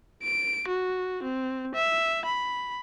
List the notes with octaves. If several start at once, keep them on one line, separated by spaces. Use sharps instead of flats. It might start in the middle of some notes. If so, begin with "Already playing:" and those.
D7
F#4
C4
E5
B5